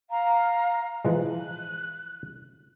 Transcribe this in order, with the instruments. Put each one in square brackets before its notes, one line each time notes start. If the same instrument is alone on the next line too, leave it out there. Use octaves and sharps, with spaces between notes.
[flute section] F5 A#5
[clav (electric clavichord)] E3 F3 G#3 [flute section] F#6